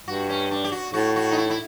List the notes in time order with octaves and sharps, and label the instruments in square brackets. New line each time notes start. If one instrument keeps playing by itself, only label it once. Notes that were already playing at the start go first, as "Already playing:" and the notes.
[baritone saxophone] G2 [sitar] F#4
[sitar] C#4
D4
G4
F#4
[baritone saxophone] A2 [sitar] F#4
[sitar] F#4
D#4
E4
E4